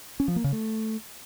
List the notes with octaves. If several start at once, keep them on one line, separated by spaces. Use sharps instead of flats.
C#4
F3
A#3
C#3
A3